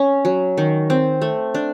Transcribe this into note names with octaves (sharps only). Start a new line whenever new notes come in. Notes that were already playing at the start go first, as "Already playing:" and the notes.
Already playing: C#4
F#3
D#3
C4
A3
D4